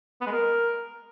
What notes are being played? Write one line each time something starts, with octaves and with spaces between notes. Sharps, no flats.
B3
G#3
A#4